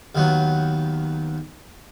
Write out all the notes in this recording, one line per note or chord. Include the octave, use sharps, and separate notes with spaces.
D#2 D#3 F#3 B3